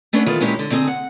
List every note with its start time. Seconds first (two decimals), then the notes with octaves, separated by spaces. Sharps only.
0.13 A3 B3 C#4 D4
0.26 D#3 E3 B3 F4 A4
0.40 A#2 G#3 C#4 D#4 E4 G4
0.59 D3
0.71 D3 C4 D#4 G#4
0.88 F#5